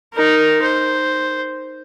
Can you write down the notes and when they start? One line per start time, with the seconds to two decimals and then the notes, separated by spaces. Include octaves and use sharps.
0.13 D#4 A#4
0.63 C5